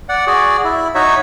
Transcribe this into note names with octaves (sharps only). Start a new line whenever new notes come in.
D5 F#5
F#4 G#4 D5
E4
D#4 F#4 C#5 E5